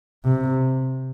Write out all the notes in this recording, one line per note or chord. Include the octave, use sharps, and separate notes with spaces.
C3